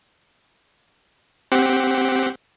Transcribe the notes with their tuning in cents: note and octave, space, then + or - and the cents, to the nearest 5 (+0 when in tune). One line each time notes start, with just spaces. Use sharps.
C4 +0 G4 +0 F#5 +10